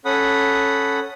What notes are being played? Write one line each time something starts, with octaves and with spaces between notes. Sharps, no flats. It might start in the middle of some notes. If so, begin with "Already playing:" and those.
C#4 A4 F#5 B5 D#6